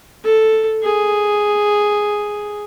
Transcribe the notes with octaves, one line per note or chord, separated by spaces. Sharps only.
A4
G#4